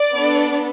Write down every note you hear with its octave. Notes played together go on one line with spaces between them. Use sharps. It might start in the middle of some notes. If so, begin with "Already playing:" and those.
Already playing: D5
B3 D4 A4